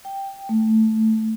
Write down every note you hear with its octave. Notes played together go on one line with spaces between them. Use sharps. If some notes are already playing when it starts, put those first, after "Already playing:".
G5
A3